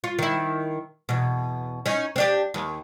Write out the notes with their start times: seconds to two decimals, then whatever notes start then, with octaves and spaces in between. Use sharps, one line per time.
0.04 F4
0.19 D#3 E4
1.09 E2 B2
1.86 C#4 D#4
2.16 C4 D4 G4
2.54 D#2